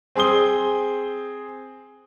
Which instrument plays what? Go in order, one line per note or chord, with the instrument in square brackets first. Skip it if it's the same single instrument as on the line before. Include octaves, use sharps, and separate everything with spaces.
[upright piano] C4 G#4 C6 D#6 G7